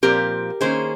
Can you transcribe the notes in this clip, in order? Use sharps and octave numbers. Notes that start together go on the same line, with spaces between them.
A#2 F3 C4 G4 A#4
D#3 A#3 C#4 G#4 C5